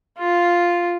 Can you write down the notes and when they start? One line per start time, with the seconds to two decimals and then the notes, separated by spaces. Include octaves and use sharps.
0.18 F4